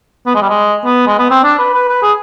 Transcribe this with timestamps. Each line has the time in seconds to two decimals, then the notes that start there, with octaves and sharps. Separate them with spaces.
0.26 B3
0.35 G#3
0.42 G3
0.49 G#3
0.85 B3
1.07 G#3
1.18 B3
1.31 C4
1.43 D4
1.59 B4
1.74 B4
1.88 B4
2.03 G#4